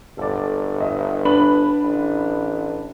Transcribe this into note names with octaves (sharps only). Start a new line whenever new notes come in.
G1 A4 D5
D#5 E5
D4 B4 B5 F#7
A1